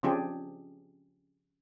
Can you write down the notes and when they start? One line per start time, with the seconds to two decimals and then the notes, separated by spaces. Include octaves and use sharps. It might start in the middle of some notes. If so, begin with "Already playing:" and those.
0.03 C#3 F3 C4 D4 G4 G#4